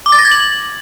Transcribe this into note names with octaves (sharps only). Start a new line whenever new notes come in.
D6
A6
A#6
G#6
F#7